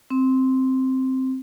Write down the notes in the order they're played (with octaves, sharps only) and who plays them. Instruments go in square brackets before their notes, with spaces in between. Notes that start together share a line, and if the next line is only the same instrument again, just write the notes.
[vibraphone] C4